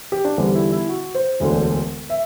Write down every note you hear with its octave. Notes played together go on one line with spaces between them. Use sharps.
G4
D4
E2 D3 G3 B3 C4
E4
E4
F#4
C5
E1 D2 D3
E5